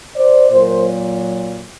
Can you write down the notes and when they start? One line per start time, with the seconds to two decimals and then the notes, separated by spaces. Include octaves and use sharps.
0.15 C5 D5
0.51 A#2 F#3 A#4 C5